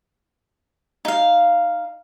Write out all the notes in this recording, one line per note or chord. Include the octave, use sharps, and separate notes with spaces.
D#4 F5